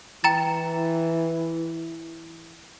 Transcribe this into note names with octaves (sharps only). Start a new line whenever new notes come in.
E3 G5 A#5 A6